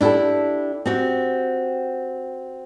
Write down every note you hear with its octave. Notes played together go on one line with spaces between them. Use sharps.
D4 E4 F#4 G4 A4
C4 F#4 G4